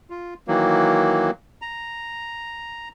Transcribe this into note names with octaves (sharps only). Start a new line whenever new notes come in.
F4
D#3 E3 F#3 A#3
A#5